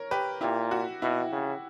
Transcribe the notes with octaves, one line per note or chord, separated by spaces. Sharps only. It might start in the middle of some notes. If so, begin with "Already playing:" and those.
Already playing: A#4 C#5
G4 B4
A#2 E4 G4
F#4
B2 E4
C#3